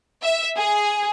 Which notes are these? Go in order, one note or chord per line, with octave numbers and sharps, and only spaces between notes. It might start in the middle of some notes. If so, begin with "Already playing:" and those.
E5
G#4